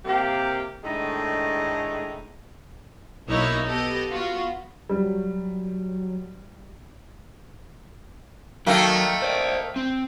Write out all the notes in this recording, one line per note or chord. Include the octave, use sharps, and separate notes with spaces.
C3 A#3 G4
A2 D#3 G#3 A3 D4 D#4
B1 A#3 D#4 E4 C#5 E5
B3 G4 A4 D#5
B3 F4 F#4
F#3 G3
D#3 F#3 A3 A#3
C5 D5
C4